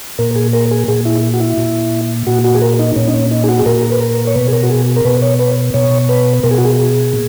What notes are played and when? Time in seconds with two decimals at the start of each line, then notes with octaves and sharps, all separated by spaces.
0.19 A#2 A#4
0.36 G#4
0.53 A#4
0.71 G#4
0.88 A#2 G#4
1.05 E4
1.34 F#4
1.40 E4
1.58 A#2
2.27 A#2 F#4
2.44 F#4
2.55 G#4
2.62 A#4
2.79 D#4
2.96 A#2 C#4
3.08 D#4
3.14 C#4
3.31 D#4
3.44 G#4
3.49 F#4
3.59 G#4
3.66 A#2 A#4
3.92 B4
4.01 A#4
4.27 C#5
4.35 B2 B4
4.48 G#4
4.53 A#4
4.63 F#4
4.70 G#4
4.96 A#4
5.05 B2 B4
5.22 C#5
5.39 B4
5.74 B2 C#5
6.09 B4
6.43 B2 A#4
6.51 G#4
6.58 F#4
6.65 G#4
7.13 A#2